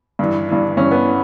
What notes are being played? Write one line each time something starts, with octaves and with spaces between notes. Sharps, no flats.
G2 E3
G2 E3
G2 E3 C#4
B3